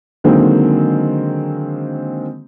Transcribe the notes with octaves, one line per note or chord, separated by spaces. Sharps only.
D3 D#3 F#3 G#3 A#3 C4